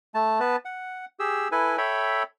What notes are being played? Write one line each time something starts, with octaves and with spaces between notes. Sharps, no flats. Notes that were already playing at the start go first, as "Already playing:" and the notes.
A3 A5
B3 B4 A5
F#5
G4 G#4 E6
E4 A4 B4 G#5
A4 C#5 E5 G5 B5